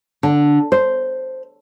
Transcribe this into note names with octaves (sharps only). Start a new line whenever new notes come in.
D3
C5